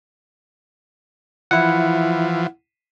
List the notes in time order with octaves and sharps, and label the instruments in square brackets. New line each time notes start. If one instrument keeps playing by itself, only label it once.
[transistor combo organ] E3 F3 [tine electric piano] E4 F#5